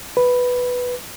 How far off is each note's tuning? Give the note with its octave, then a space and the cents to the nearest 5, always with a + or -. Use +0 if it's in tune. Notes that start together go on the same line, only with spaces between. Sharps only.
B4 +0